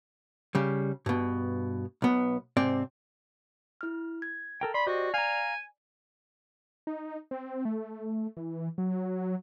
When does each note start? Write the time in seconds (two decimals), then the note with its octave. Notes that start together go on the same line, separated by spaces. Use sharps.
0.55 C#3 G3
1.06 G2 B2
2.02 B1 B3
2.57 G#2 C3 C4 D5
3.81 E4 F6
4.22 G#6
4.61 A4 A#4 G5
4.74 D5 B5 C6
4.87 F#4 G4 C5 D#5
5.14 F5 G#5 A#5
6.87 D#4
7.31 C4
7.65 A3
8.37 E3
8.78 F#3